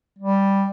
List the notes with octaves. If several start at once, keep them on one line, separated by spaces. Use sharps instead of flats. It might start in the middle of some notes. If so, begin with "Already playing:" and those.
G3